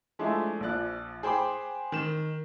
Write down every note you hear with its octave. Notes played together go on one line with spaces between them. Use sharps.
F3 G#3 A3 D4 E4
A#1 F3 D5 F#6
G#4 C5 G5 B5 D6
D#3 E7